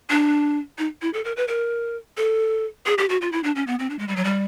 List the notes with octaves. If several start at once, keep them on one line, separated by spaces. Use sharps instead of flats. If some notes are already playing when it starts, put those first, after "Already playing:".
D4
D#4
E4
A4
A#4
B4
A#4
A4
G#4
G4
F#4
F4
E4
D4
C#4
B3
C4
D4
G#3
G3
F#3
G3